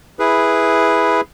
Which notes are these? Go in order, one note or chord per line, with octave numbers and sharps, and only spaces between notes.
E4 G#4 B4